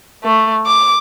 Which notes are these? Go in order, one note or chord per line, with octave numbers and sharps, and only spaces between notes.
A3
D6